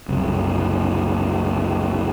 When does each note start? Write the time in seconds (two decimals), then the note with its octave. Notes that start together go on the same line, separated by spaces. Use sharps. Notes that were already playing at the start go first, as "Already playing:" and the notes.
0.09 F#1 C2